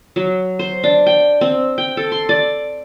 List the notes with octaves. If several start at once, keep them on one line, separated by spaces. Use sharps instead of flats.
F#3
C5
D4
G5
C4
G5
A4
C6
D5